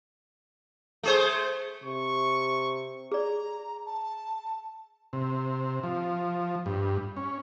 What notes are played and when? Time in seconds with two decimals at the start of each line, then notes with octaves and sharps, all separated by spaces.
1.03 A3 G#4 C5
1.84 C3 C#6
3.12 G#4 D5 A#5
3.85 A5
5.13 C3
5.83 F3
6.66 G2
7.17 C#4